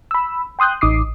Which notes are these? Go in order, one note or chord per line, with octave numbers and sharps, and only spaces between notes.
B5 E6
G5 C6 D#6 F#6 G6
A1 D#4 D6 D#6 C7